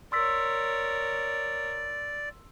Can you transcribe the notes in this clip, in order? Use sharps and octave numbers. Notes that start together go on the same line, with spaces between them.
A#4 C#5 D5 C6 E6 B6